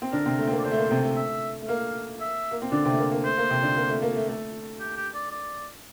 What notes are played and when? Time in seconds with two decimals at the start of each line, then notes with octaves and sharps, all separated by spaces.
0.02 C4
0.12 D3 D4 A#4
0.26 C3 C4
0.39 A3
0.47 C4
0.51 A#3
0.59 D5
0.65 D3 D4 C5
0.71 A3
0.78 A#3
0.90 C3 C4
1.04 A3
1.16 E5
1.62 A3
1.68 A#3 F5
2.21 E5
2.51 A#3
2.62 C4
2.72 D3 D4 D5
2.85 C3 C4
2.92 A3
2.98 A#3
3.11 A#3
3.24 A3 C5
3.38 A#3
3.50 C3 C4
3.63 D3 D4
3.76 A#3
3.89 A3
4.02 A#3
4.16 A3
4.28 A3
4.80 G4
4.97 G4
5.15 D5
5.31 D5